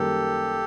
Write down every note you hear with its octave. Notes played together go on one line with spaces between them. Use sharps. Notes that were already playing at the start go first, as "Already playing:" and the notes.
Already playing: F#2 D#3 G3 A#3 G4 A4